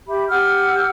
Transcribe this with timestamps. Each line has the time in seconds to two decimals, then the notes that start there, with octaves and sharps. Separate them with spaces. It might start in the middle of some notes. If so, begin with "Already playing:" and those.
0.08 G4 E5 B5
0.28 G4 F#5 E6 F6